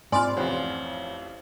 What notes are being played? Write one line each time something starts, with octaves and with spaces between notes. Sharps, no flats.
G#2 C4 F4 D5 G#5 B5 C6 F6
A1 F2 F3 C5 C#5 F#5